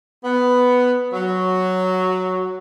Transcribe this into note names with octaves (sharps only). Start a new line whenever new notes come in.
B3
F#3